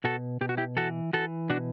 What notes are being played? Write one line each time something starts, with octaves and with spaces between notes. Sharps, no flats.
B2 F#4 A4
B2 G4
F#4
E4 G4
E3 F#4 A4
E3 F#4 A4
B2 D4 F#4